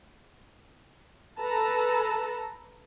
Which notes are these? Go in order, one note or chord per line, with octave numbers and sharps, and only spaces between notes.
A4 B4 A5 A#5